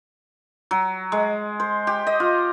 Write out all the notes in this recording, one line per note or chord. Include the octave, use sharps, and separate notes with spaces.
F#3
G#3
C5
G4
D#5
F4